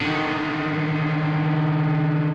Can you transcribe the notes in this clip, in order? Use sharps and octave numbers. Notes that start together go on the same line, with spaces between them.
D3 D#3